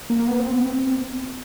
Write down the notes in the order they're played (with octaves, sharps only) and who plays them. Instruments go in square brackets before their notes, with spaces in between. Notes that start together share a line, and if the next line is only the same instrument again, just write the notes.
[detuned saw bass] A#3
B3
C4
B3
C4